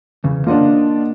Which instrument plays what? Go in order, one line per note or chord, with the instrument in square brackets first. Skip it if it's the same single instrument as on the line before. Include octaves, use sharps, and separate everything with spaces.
[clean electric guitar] E2 C#3
[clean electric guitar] A#3 D#5 F#5 [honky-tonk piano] D4 F4